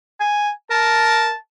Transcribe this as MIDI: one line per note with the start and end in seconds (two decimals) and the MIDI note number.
0.20 0.51 80
0.71 1.32 70
0.71 1.37 81